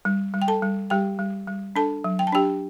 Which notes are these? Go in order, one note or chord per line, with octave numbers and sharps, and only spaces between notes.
G3
G3
G5
A4 A5
G3
G3 G4 G5
G3
G3
D4 A4 A5
F#3
G5
A5
D4 G4 G5